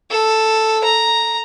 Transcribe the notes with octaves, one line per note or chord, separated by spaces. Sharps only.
A4
A#5